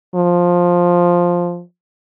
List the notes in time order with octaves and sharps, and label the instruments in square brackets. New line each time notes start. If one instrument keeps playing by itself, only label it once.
[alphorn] F3